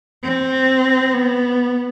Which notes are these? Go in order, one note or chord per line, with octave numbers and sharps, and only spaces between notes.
C4
B3